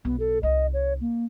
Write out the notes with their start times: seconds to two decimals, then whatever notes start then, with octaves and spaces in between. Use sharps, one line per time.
0.05 B1 B3
0.20 A4
0.43 C2 D#4 D#5
0.73 C#5
1.01 A#3